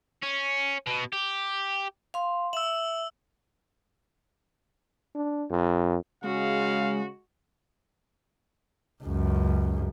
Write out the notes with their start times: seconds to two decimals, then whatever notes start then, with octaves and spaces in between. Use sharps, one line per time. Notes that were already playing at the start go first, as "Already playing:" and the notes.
0.23 C#4
0.87 B2
1.13 G4
2.14 F5 C6
2.53 E5 E6 F#7
5.15 D4
5.50 F2
6.24 C#3 G#3 F#4 F5
9.03 C#2 F#2